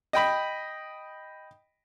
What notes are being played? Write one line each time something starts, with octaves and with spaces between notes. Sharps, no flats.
D#5 G5 B5